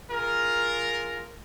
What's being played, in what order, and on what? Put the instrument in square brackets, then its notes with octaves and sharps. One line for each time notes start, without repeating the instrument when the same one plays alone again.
[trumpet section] F4 G#4 A#4